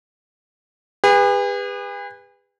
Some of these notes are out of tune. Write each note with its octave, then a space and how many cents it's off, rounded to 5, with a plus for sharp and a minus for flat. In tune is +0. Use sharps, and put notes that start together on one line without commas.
G#4 -45 B4 +0